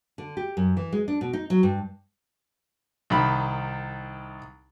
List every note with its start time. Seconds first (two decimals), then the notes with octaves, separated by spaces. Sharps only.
0.18 D3
0.37 G4
0.57 F#2
0.77 E3
0.93 G#3
1.08 D4
1.21 B2
1.33 D#4
1.50 F#3
1.63 G2
3.10 C2 D#3 B5